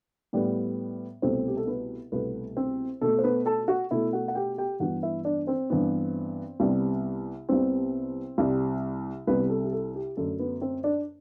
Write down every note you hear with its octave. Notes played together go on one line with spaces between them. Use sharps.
A2 G3 B3
C2 B2 A3 C4 C5
G4
A4
B3 B4
C2 B2 A3 B3 B4
C4 C5
B2 A3 A4
C5
B3 B4
A4 A5
F#4 F#5
B2 A3 E4 E5
F#4 F#5
F#5
G4 G5
G4 G5
G2 E3 B3 F#4 F#5
E4 E5
D4 D5
C4 C5
G2 E3 B3
C2 C3 G3 B3
C2 C3 G3 B3 C4 C5
C2 C3 G3
C2 C3 G3 B3 B4
A4
G4
A4
G4
F#2 D3 A3 A4
B3 B4
C4 C5
D4 D5